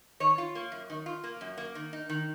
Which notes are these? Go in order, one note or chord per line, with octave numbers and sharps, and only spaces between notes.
D#3 C#5
F4
A#3
F#2
D#3
F4
A#3
F#2
A#3
D#3
D#4
D#3